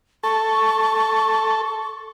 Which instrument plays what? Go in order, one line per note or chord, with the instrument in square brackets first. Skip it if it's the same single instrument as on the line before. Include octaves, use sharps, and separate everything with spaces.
[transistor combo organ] A4 [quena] C#6